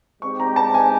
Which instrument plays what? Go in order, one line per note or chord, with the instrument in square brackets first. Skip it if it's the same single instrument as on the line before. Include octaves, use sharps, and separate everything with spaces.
[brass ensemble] G#3 C4 D#4 G4 [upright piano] C#6
[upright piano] A#5
A5
G#5